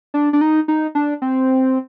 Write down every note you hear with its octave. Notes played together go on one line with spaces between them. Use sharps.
D4
D4
D#4
D#4
D4
C4